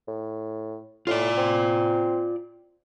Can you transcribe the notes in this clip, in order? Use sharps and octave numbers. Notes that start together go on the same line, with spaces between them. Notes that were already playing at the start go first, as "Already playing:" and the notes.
A2
A2 F4 D5
C4